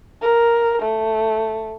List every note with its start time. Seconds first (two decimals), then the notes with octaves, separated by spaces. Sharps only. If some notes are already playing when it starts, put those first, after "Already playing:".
0.22 A#4
0.82 A3